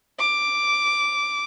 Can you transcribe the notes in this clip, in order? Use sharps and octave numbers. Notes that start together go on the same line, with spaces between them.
D6